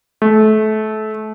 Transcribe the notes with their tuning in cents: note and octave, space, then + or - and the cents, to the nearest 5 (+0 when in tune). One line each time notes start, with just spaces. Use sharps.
A3 -25